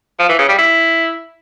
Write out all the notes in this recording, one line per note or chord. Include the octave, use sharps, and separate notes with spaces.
F3
E3
C#3
G3
E4